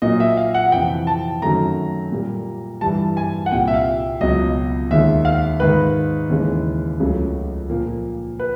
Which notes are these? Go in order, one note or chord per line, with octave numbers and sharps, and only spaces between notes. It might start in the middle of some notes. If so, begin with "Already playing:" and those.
A#2 F#3 A#3 D#5
E5
F5
F#5
F2 C3 E3 G5
A5
F#2 D#3 F#3 A3 A#5
A#2 G3 A#3
G2 E3 G3 A5
G#5
F#5
C2 A#2 G3 G5
E5
F5
C#2 B2 F#3 D#5
D#2 D#3 G#3 E5
F5
G#2 D#3 G#3 B4
D#2 C#3 E3 G#3
C#2 C#3 F#3 A3
A#2 F3 A#3
B4